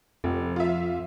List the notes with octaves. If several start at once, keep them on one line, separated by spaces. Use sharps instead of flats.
F1 F2
F4 E5